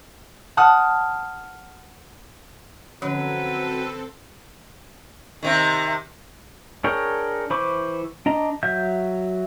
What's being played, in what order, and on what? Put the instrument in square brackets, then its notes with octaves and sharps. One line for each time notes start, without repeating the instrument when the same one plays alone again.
[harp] F#5 A5 D#6 F6
[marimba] D3 F3 C#4 [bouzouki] F#3 [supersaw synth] C4 A4 [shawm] B4
[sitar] C3 D#3
[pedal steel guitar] D4 G#4 A#4 C#5 G5
E3 C5 B5 C#6 D6
D4 D#5 A#5
F#3 E5 G6